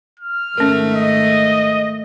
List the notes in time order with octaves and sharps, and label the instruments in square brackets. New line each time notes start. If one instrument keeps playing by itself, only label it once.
[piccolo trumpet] F6
[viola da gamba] G#2 D#3 A3 [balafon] C#4 A#4
[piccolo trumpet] D#5